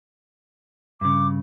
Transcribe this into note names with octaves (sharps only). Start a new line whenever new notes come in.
G2 C#3 D6